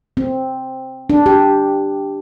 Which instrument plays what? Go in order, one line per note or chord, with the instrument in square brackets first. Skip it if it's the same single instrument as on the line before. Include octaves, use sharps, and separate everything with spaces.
[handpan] C4
D4
G4